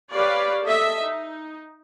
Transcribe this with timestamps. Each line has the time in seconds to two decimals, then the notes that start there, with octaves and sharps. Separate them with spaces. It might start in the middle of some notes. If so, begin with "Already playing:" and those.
0.12 G4 B4 C#5 D5 F5
0.64 A4 D#5 E5
1.03 D#4